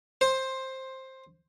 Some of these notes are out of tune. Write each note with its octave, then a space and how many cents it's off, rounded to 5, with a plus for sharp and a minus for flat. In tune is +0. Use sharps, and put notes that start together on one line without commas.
C5 +10